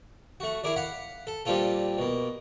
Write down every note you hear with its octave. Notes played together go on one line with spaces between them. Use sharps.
A3 F#4
E4 G#4 A#4 D5
F5 F#5 B5
A4
A#2 G3 A#3 C4 F4 A4
B2 A#3